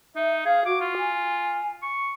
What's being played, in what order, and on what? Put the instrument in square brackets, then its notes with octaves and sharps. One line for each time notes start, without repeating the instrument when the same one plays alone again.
[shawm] D#4 [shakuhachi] E5
[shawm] G#4 [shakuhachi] F5
[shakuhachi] F#4 [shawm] D6
[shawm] F4
[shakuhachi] G#5
[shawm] C#6